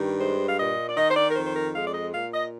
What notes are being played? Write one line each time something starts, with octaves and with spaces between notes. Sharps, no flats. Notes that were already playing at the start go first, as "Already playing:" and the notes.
Already playing: G2 D#3
G#3 C5
F5
A#2 D#5
D5
D#3 D#5
C5
D5
A#4
F2 C5
C5
A#4
G#3 F5
D5
D#5
A#2 F5
D#5